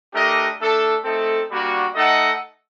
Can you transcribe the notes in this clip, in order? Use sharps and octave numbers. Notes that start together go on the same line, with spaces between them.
A3 D4 G4 A#4 D#5
A3 D4 A4
A3 C4 D#4 A4
G3 A#3 D4 F#4
A3 D#4 A4 D#5 F#5